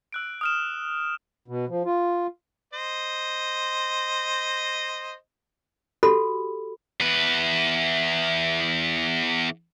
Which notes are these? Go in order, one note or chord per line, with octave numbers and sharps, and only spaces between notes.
E6 F#6 D7
D#6 F6 E7
B2
F3
F4
C5 D#5
F#4 G4 A4 B5
E2 B4